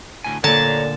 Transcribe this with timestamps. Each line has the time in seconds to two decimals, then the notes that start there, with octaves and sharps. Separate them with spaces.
0.24 D2 A2 G#5
0.44 A#2 D3 A4 C#5 D5 A5 A#5